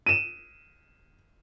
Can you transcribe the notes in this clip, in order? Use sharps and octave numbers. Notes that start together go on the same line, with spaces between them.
D#7 E7